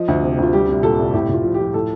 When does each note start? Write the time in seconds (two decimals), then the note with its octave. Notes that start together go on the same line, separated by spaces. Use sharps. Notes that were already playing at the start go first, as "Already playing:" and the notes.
Already playing: F3 D#5
0.08 D2
0.23 C3
0.38 D2 F4
0.53 G3 G4
0.68 C2
0.83 A#2 A4
0.99 C2
1.13 A2 G4
1.29 A2 F4
1.44 F3
1.54 G4
1.60 F3
1.74 A2 A4